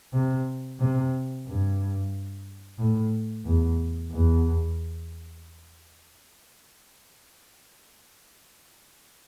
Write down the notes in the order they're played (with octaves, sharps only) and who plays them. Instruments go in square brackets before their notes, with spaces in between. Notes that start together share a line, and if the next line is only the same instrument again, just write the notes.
[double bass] C3
C3
G2
A2
E2
E2